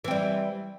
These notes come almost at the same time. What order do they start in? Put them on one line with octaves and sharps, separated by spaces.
E3 C4 G3